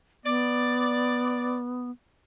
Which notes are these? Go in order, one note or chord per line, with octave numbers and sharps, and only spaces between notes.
B3 D5